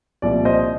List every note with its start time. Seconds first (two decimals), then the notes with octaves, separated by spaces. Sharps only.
0.22 C2 A#2 F3 D5
0.45 C5 D#5